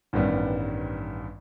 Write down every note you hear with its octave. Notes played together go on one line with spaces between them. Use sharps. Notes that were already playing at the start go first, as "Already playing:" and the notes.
A1 G2 D#3 G3 B3